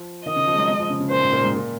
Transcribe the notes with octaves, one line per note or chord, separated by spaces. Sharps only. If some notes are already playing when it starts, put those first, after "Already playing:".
Already playing: F3
D#3 D#5
C#3
F3
G#3
F#3
G#3
F3
C#3
C#3
A#2 C5
G#2
A#2
G#2
A#2